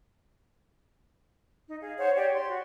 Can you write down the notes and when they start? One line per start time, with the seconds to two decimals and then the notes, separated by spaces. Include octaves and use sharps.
1.67 D#4
1.81 G#4 F5
1.98 C5 C#5 F#5
2.15 G4 C#5 D5
2.33 C6
2.49 F#4